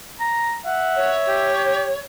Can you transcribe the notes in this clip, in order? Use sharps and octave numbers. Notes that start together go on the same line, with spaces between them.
A#5
E5 F#5
C#5
G4